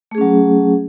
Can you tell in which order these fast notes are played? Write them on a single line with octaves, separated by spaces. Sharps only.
A3 G#4 C#4 F#3